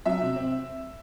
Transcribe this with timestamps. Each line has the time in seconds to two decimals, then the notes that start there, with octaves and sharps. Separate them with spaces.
0.05 F#3 E5
0.21 C3
0.36 C4